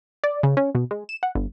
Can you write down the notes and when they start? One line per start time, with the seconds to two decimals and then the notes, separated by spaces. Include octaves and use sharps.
0.24 D5
0.43 C#3
0.57 C#4
0.75 B2
0.91 G#3
1.09 E7
1.23 F#5
1.35 G1